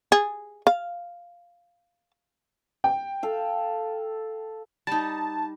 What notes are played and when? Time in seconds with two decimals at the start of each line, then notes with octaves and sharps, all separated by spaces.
0.12 G#4
0.67 F5
2.84 G5
3.23 A4 F5
4.87 G3 D#4 A5